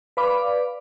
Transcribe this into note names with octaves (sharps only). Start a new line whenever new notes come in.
B4 D5 F5 B5 D6